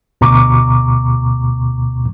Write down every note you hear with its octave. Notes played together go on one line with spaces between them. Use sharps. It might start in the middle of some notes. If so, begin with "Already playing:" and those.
D2 B2 A#5 C#6 D6